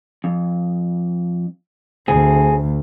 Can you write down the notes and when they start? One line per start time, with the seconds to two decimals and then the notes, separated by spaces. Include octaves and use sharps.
0.24 F2
2.08 D2 C4 G#4